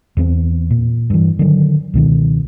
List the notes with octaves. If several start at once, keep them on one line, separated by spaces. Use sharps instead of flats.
E2 E3 A#3 C4
A#2
G2 E3
D3 D#3 F#3
C#2 B2 D#3